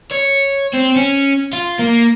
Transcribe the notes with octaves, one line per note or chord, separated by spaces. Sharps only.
C#5
C4
C#4
F4
A#3